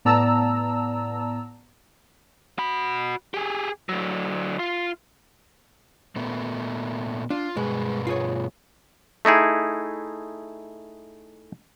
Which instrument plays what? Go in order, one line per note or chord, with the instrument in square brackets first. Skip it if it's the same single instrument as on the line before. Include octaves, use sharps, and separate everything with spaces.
[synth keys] A2 B3 D5 A5 A#5 E6
[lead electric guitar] F#4 B5
G4 G#4
D3 F#3
F4
[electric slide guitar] A#2 A3 B3
[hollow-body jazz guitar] D4 [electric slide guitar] F4
[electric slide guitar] G2 B2 B4 [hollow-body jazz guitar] G#3
[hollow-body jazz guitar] F4 G#4 C#5
[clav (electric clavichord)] A3 D#4 E4 G#4